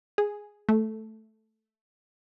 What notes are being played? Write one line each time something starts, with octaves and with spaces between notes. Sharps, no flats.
G#4
A3